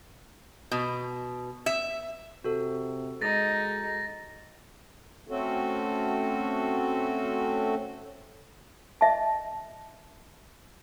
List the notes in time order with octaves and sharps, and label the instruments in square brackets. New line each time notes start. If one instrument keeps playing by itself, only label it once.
[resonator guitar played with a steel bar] B2
E5
[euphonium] C3 [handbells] F#4 A4
[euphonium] G#3 [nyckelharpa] D#4 [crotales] A6 A#6
[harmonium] A3 C4 C#4 F#4 A4
[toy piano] D#5 E5 A5